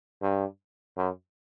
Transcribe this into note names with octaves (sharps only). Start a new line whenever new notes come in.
G2
F#2